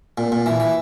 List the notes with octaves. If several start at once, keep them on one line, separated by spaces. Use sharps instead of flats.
A#2
A#2
E3
E3